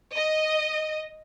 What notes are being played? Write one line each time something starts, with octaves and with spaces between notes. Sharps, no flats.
D#5